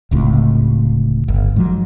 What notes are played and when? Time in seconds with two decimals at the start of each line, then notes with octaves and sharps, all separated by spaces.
0.11 D1 C#2 A2 C3
1.28 G1
1.56 G#2 F3 F#3